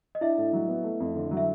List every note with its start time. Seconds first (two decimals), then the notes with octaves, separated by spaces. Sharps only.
0.15 D#5
0.21 D4 E4 E5
0.38 A2
0.53 F#3
0.68 B3
0.84 A3
1.00 F2
1.15 D3
1.31 F#3
1.37 E5